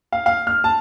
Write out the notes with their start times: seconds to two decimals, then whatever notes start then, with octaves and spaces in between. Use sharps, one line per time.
0.12 F5
0.26 F5
0.47 F6
0.64 A5